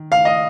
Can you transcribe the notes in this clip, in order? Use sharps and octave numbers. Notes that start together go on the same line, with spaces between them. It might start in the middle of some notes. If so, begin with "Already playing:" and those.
Already playing: D#3
F5
D#5